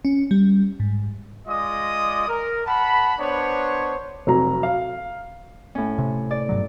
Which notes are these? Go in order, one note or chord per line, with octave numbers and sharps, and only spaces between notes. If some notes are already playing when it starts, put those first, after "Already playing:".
C#4
G3
G#2
G#3 F4 D5 D#5 D#6
A#4
F#5 A5 B5
B3 D4 C5 C#5
F1 F#3 A#5
F5
A2 C#4
C3
D5
G2 B2 F#3